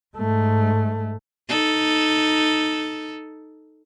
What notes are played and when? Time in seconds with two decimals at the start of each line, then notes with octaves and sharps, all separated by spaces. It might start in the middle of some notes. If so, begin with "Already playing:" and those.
0.17 G#2 A3
1.48 D#4 A4